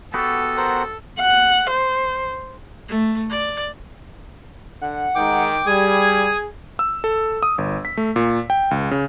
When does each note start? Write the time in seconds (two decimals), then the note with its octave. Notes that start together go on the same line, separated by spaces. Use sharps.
0.14 B3 F#4 G4 A4
0.57 A#4 C5 F#5
1.20 F#5
1.70 C5
2.88 A3
3.29 D5
4.82 D3 F#5
5.15 D#3 G#3 D#4 G5 D6
5.66 G3 G#4 D#6 G#6
6.79 E6
7.04 A4
7.43 D#6
7.58 G1
7.85 B6
7.97 A3
8.16 A#2
8.50 G5
8.71 C#2
8.91 C#3